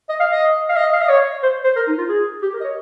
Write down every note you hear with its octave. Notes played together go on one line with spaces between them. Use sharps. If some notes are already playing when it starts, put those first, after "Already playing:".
D#5
F5
D#5
F5
D#5
F5
D#5
C#5
C5
C5
A#4
D#4
F4
G#4
G4
A#4
D#5
C#5